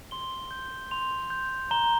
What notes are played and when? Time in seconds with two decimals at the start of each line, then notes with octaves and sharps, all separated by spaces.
0.11 C6 G7
0.51 G6
0.91 C6 F7
1.30 G6
1.71 A#5 G7